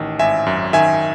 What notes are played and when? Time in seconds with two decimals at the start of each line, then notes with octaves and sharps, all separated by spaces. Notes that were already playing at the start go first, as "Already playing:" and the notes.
Already playing: A1 D#3
0.19 G#1 E5 G#5
0.46 F#2
0.73 D#3 E5 G#5